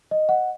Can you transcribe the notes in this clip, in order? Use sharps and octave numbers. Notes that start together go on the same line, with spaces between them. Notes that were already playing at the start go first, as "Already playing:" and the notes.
D#5
F#5